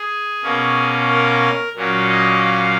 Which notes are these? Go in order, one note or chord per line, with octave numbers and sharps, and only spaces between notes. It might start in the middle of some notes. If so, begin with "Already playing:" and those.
Already playing: G#4
B2 A#3 C#4
A#4
A#2 F#3 A#3 C#4
D#5
F5